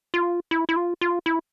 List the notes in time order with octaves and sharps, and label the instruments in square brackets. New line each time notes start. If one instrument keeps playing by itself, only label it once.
[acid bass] F4
E4
E4
F4
F4
E4